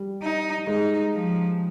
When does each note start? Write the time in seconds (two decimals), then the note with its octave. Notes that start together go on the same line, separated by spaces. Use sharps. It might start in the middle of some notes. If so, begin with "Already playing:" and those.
Already playing: G3
0.22 D#4
0.67 G#3 D#4
1.13 F3